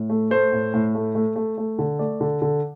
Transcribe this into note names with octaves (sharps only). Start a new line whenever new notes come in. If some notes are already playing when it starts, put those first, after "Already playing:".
Already playing: A2
A3
A3 C5
A2
A2
A3
A3
A3
A3
D3
A3 D5
D3
D3